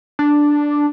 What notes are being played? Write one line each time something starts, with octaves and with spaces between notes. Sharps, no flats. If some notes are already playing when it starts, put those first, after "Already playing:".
D4